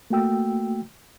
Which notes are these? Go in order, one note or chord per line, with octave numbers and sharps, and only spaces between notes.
A3 A#3 F#4 G5 E6